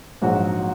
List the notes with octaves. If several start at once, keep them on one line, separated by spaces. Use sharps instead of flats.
A#1 G#2 F#3 D#4 F#4